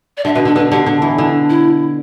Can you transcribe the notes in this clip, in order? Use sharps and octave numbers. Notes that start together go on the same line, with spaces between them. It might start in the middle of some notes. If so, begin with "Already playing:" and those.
D5
D3 E5
B2 B4
D3 A4
D3 B4
D3 G4
D3
E3
D3
E4